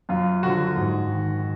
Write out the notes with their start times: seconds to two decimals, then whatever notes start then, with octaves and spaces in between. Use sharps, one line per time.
0.09 F#2 F4
0.42 D3 F3 F#4
0.76 G#2
1.09 D#3